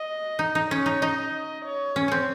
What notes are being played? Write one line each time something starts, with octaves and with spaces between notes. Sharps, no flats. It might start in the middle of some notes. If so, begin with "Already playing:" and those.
Already playing: D#5
D#4
D#4
C#4 C#5
D#4
D#4 D#5
C#5
C#4
C4 C#4